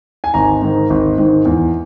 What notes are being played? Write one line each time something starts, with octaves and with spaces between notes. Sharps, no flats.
G#5
G#1 A#5
G#2 D#3
G#1
G#2 D#3
E2